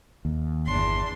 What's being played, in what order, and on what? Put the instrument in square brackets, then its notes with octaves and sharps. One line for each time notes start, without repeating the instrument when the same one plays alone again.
[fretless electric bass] D#2
[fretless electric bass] G1 [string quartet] E2 D4 C6